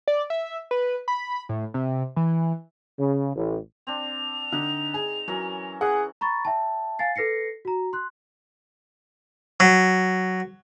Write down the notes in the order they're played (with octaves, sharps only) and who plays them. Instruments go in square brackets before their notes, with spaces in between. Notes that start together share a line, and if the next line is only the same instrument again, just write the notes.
[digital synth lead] D5
E5
B4
B5
A2
C3
E3
[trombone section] C#3
A1
[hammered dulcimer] C4 D4 [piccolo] F7
[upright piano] D3 [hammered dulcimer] D#4
[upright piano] G#4
[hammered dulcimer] E3 C#4 A#4 [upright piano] F#3
[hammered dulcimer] E3 [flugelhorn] G#4 [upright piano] F#5
[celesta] A#5 B5 C#6 A6
E5 G5 A5
F5 G#5 A6 C7
A4 B4 A#6 C7 C#7
F#4 A#5
C6 F#6
[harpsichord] F#3